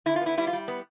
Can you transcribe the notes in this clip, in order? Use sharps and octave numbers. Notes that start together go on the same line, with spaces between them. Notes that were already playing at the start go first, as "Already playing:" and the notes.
D3 E4
F4
B3 E4
G3 E4
F4
G3
B3